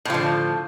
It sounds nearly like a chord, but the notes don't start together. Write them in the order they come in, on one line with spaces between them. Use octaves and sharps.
A2 F3 D3